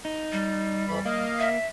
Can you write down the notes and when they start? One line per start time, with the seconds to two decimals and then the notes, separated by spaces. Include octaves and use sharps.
0.05 D#4
0.32 G3
0.88 F2 E3 B5
1.06 A#3 D#5 F5
1.39 E5